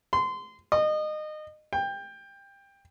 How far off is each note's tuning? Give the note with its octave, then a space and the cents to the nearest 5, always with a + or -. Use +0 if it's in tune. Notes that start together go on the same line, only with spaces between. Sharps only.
C6 -25
D#5 -25
G5 +20